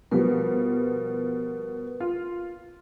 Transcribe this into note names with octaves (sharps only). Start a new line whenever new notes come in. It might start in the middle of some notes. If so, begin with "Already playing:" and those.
B2 F3 G3 A#4 B4
F4